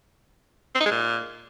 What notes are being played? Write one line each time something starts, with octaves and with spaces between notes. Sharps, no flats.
C4
D#4
G#3
A#2